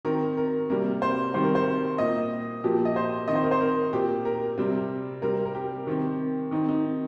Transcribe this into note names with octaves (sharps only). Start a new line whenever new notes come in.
D#3 C4 A#4
A#4
C3 G3 A#3 A#4
C5
D#3 G3 C4 C5
A#4
C5
A#2 A#3 D#5
A#2 F3 A#3 G4
D#5
C5
D#3 C4 D#5
C5
A#4
C5
A#4
A#2 A#3 G4
A#4
C3 G3 C4
C3 G3 C4 A#4
A#4
G4
D#3 C4
D#3 C4 D#4
D#4